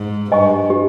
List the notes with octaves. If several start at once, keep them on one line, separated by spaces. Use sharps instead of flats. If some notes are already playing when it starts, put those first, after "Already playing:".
Already playing: G#2
G2 D#5 G#5 C#6
G4